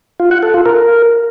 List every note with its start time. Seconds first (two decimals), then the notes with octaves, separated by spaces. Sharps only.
0.20 F4
0.31 F#5
0.43 A4
0.54 F4
0.66 A#4